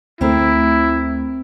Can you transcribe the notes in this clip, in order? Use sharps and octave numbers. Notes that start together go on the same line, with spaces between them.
D2 A3 C4 E4 A#4